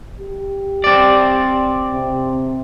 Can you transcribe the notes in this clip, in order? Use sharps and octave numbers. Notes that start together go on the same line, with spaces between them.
G4
C4 D5
C3